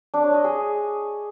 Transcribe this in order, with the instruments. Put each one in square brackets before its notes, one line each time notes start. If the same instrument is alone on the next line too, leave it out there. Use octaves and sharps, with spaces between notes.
[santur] D4
C#5
D#5
G#4